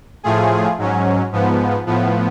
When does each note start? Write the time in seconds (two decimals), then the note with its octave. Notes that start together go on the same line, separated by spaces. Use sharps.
0.23 A2 F3 A3 F4 G#4
0.78 G#2 F#3 C#4
1.32 G#2 F3 B3
1.86 A2 F3 B3